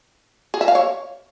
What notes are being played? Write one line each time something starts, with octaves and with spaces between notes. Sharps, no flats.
G#4
E5
F5
C#5